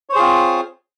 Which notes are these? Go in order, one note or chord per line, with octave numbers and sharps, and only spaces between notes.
C4 F4 G#4 C5 C#5